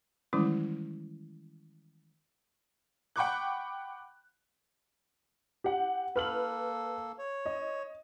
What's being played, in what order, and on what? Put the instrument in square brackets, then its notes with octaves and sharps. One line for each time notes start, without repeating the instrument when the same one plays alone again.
[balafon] D#3 E3 G3 G#3 C#4 E4
[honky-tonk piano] F#5 G5 B5 C#6 D6 F#6
G4 F#5
[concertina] A#3 A4 [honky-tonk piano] B4 F6 F#7
[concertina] C#5
[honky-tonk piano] D#5